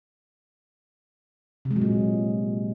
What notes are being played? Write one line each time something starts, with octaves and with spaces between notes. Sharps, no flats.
C3
G#3
F#3
A#2